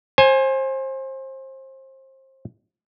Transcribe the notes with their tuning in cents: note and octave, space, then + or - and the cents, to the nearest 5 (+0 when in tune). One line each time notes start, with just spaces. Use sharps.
C5 +30 G#5 +0